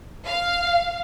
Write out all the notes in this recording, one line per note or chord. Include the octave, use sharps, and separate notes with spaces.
F5